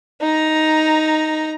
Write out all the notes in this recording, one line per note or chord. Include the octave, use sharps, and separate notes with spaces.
D#4 A#5